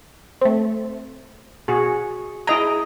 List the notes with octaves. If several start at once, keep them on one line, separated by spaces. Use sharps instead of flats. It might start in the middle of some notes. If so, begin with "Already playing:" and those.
A3 C4
B2 F#4 G#4
E4 G#4 D#5 A#5 D7